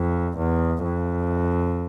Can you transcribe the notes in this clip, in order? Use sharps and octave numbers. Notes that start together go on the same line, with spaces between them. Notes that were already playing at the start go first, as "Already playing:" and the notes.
Already playing: F2
E2
F2